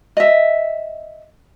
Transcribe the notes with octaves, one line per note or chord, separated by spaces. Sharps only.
D#5 E5